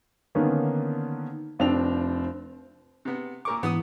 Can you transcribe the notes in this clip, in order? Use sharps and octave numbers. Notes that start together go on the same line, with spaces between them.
D3 D#3 A#3 B3 C#4 D4
F1 C4 D4 F7
C3 B3
A#2 A#4 C#6 D6
G#2 E3 B3 D#6